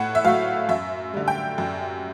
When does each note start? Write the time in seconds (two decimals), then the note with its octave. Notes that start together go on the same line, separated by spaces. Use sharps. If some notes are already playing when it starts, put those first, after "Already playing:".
Already playing: A2 F#5
0.15 E5
0.25 F#3 A3 F5
0.69 F#2 E5
1.14 D3 G3
1.28 G5
1.58 F#2